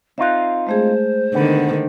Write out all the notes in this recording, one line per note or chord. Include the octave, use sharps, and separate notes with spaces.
C4 D#4 F4 E5 F5 F#6
G#3 A3 G#4 C5
D3 D#3 B3